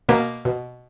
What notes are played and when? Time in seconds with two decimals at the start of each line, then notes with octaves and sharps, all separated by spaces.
0.09 B2 A#3
0.45 B2